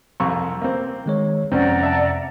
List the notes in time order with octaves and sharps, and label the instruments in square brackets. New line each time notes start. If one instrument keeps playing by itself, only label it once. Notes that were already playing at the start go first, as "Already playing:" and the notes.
[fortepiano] C2 F2 C#6 [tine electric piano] A#5 E6
[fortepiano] A#3 C4
[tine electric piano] D#3 G#3 C#5
[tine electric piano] F2 C3 [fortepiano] C4 C#4 [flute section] D5 F#5 A#5
[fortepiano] E5 A5